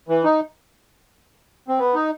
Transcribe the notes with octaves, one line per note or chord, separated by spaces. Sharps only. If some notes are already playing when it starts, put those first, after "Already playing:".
E3
D#4
C4
B3
D#4